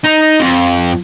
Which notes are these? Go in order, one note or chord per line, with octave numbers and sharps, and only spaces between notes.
D#4
F2